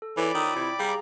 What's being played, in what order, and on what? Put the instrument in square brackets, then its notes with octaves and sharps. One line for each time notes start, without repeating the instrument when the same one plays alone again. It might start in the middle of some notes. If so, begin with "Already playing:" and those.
[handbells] A4
[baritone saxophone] E3 [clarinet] A4 [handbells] C#5 [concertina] D5 B5 D6
[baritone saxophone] D#3 [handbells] F4 E6 [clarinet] D#6
[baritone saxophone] C3 [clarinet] E4 [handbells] G5
[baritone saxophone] G3 [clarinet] G4 [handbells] G#4 F5 A#5